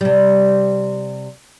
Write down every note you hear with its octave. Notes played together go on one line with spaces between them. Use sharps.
C3 G3